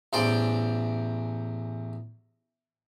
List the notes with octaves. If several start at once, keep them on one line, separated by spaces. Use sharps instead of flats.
A1 E2 C5 D5 G5